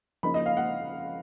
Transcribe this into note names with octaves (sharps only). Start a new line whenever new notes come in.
C#3 F3 A#3 D#4 B5
D#5
F5
F#5